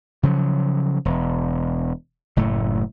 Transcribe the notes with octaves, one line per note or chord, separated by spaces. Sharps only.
C#3 F3 F#3
E1
F#1 A2 A3